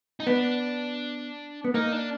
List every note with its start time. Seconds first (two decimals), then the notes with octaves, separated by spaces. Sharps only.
0.20 D#4
0.27 B3 D4
1.64 B3
1.74 A#3 D#4
1.92 D4